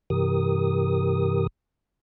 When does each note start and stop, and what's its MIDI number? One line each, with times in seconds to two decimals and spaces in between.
0.10 1.47 43
0.10 1.47 48
0.10 1.47 52
0.10 1.47 67
0.10 1.47 70
0.10 1.47 87